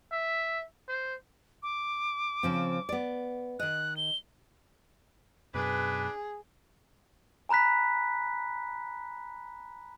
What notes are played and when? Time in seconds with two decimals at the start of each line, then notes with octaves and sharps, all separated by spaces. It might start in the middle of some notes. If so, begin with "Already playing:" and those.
0.12 E5
0.89 C5
1.63 D6
2.43 C#3 F3 C4
2.89 B3 D5
3.59 D#3 D#5 F#6
3.97 G7
5.54 F#2 B2 D4 G#4 B4
7.49 G#5 A#5 B5 F#6 B6